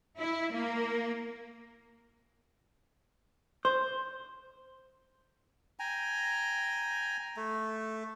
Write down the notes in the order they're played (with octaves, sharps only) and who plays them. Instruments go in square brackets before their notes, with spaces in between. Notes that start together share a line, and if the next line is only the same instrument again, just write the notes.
[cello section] E4
A#3
[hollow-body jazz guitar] C5
[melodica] G5 G#5 A#5
A3